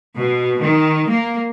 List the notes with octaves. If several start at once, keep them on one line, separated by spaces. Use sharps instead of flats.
B2
D#3
A#3